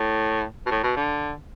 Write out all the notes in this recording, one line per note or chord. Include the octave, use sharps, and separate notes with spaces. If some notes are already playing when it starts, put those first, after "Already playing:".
Already playing: A2
B2
A2
B2
D3